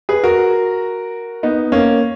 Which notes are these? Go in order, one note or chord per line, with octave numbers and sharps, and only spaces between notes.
G#4 B4
F#4 A#4
B3 D#4
A#3 C#4